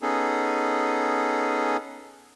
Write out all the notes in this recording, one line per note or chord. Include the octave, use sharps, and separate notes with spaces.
B3 C#4 D#4 G#4 A4